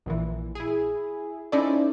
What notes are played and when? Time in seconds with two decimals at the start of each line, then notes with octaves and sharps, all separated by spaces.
0.06 A#1 A#2 E3
0.55 E4 G#4
1.52 C#4 D#4 E4 A4 C5 D5